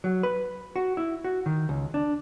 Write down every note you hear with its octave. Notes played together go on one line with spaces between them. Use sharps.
F#3
B4
F#4
E4
F#4
D#3
C#2
D4